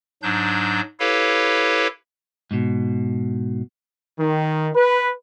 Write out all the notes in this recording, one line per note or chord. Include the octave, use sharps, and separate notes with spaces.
G#2 F#3 D4 G6
E4 G4 A4 B4 C#5 F5
G#2 B2
D#3
B4